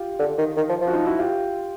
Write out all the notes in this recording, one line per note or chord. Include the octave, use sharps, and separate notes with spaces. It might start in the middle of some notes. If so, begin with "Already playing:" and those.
Already playing: F4 G4
D3
D#3
D#3
F3
F3
F#4
D#4 F4
E4 F#4
F4 G4